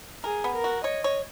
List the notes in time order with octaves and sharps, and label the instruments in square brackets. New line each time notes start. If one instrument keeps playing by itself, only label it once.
[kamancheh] G#4 [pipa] A#4
[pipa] B3
[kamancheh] A#4
[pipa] F#4
[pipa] C#5 [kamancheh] D#5
[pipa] C#5